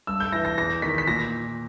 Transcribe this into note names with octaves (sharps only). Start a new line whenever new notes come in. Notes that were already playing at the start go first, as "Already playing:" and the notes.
G2 E6
G6
E3 A#6
A#6
E2 A#6
D#3 B6
B6
A#2 A#6